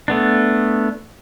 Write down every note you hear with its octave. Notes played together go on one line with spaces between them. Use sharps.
A3 B3 D4